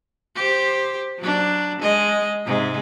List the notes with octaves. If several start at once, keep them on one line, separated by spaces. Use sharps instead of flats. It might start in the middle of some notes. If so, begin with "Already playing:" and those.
G4 C5
F#3 D4
G#3 D#5
G#2 C3 G#3